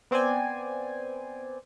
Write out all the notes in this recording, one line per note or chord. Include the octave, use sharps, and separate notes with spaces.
B3 C4 C5 D5 G#5